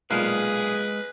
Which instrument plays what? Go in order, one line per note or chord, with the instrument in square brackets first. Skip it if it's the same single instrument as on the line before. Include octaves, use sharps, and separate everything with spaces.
[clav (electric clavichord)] B1 A#2 [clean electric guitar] G#3 F5 [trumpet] G#4 [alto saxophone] B4